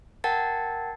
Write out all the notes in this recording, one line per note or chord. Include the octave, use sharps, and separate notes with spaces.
A#4 F#5 G5 A5 G#6 A6